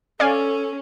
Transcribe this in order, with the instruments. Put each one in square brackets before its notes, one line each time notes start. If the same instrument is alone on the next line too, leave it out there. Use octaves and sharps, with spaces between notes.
[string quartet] C#4 [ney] A4 [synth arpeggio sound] D5 F5 G#5